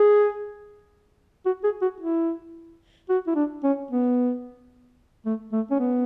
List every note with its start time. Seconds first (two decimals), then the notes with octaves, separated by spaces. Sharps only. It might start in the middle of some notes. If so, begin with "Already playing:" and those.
Already playing: G#4
1.46 F#4
1.64 G#4
1.82 F#4
2.00 E4
3.09 F#4
3.27 E4
3.35 D4
3.64 C#4
3.91 B3
5.26 A3
5.52 A3
5.71 C#4
5.79 B3